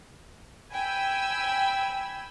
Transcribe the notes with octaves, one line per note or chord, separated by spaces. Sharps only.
G5 G#5 B5 E6